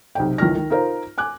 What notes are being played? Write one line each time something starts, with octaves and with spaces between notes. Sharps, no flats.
B1 C3 G5
C#2 D#3 E3 F6 A#6
D#3
D#4 F4 A#4 C5
G#5 D6 F#6